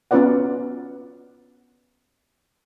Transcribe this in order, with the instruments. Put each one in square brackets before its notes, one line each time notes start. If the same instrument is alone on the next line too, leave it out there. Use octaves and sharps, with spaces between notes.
[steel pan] B3 C#4 F4 B4 D5 F#5